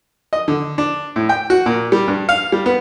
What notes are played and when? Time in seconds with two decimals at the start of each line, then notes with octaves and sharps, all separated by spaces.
0.33 D#5
0.48 D3
0.78 D4
1.16 A2
1.29 G5
1.50 F#4
1.66 A#2
1.92 G3
2.08 G2
2.29 F5
2.52 G3
2.66 B3